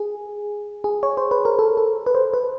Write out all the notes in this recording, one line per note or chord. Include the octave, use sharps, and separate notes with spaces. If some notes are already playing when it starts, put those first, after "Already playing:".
Already playing: G#4
G#4
C#5
C5
B4
A#4
A4
A4
B4
C5
B4